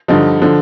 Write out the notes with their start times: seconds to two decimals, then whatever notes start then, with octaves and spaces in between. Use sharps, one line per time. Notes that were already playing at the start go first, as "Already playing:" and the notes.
0.08 G2 D3 F3 D#4
0.42 D3 F3